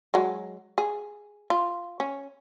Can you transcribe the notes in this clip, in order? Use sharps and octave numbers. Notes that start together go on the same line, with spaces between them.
F#3 G#3
G#4
F4
C#4